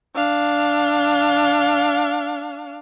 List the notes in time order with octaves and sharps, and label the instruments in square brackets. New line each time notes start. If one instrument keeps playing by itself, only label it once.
[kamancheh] D4 F5